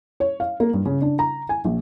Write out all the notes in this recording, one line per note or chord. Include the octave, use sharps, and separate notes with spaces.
C#5
F5
A#3
G2
C#3
D4
A#5
G#5
A#1